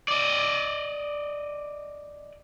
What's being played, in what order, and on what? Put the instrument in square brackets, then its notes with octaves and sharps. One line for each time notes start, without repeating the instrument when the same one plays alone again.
[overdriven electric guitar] D5 D#5